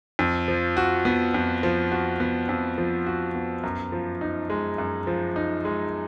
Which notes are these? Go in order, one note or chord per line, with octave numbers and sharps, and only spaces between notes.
F2
F3
F#4
B3
F2
F3
F#4
B3
F2
F3
F#4
B3
F#2
F3
D#4
G#3
F#2
F3
D#4
G#3